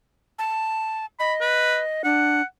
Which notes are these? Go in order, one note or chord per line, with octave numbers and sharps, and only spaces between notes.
A5
D#5 B5
B4
D4 F#5